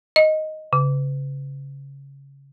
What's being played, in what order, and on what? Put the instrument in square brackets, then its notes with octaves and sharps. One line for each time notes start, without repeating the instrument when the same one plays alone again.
[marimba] D#5
C#3